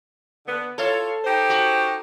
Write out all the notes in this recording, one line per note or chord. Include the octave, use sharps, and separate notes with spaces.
D3 B3
E4 F4 A4 C#5
D#4 G4 C5
F#4